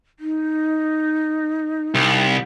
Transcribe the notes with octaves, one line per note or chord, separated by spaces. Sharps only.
D#4
C2